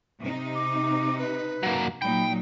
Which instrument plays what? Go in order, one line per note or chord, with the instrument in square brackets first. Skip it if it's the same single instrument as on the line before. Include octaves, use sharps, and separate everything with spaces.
[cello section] C3 D#4
[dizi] D6
B4
[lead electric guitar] F#3 A#3
[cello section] A#2 F#3 D#4 [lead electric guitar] G5 [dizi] B5